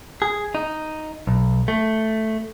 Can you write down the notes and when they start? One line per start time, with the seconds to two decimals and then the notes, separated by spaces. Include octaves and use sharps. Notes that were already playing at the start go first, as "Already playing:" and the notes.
0.22 G#4
0.55 D#4
1.27 B1
1.68 A3